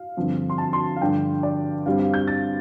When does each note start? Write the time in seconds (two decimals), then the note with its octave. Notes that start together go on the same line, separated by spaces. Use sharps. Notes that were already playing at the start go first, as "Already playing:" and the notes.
Already playing: F5
0.17 G2 D3 F3 C4
0.50 C6
0.58 A5
0.73 C6
0.96 F5
1.01 G2 D3 F3 D4 G5
1.43 D5
1.86 G2 G3 C4 F5
1.99 F5
2.14 G6
2.28 A6